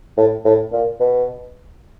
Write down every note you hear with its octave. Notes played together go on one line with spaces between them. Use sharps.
A2
A2
A#2
B2